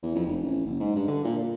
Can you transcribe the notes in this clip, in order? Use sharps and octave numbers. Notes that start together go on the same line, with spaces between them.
E2
F2
F1
A1
F#1
G#2
G2
D3
A#2
A#2